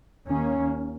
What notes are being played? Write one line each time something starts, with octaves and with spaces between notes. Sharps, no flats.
D#2 D#3 A#3 C#4